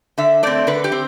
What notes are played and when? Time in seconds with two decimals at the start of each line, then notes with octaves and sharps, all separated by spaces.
0.18 D3 E5
0.43 A3 C4 D5
0.67 D3 B4
0.84 G4
0.92 C4